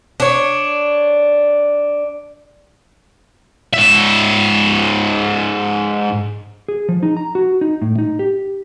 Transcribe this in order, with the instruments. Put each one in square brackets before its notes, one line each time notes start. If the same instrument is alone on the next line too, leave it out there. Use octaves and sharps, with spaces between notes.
[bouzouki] D4 C#5
[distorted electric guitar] G#2 E5
[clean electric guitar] G#4
F3
D#4
A#5
F#4
D#4
A2
D#4
G4